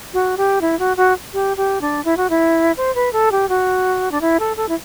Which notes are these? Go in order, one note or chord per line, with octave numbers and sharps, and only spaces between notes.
F#4
G4
E4
F#4
F#4
G4
G4
D4
E4
F#4
E4
C5
B4
A4
G4
F#4
D4
E4
A4
A4
E4